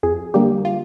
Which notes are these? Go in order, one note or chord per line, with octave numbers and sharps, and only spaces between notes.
F2 G#4
D3 G3 A#3 G4
F4